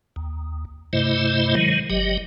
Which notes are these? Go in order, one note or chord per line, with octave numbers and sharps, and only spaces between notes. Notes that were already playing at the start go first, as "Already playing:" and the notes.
D#2
G2 C3 A3 E4 C5 D#5
D#3 F#3 G#3
G1 F#3 G4 D#5